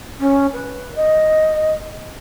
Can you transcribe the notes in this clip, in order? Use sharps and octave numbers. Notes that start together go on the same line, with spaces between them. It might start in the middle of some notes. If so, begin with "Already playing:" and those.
C#4
B4
D#5